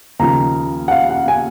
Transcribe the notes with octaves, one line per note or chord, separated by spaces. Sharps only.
D#2 C#3 F3 A#5
F#5
F5
F#5
G#5